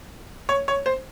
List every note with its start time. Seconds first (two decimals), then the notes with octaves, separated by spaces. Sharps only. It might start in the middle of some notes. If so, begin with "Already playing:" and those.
0.49 C#5
0.68 C#5
0.86 C5